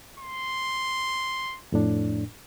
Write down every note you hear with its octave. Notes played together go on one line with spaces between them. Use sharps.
C6
F2 A2 D4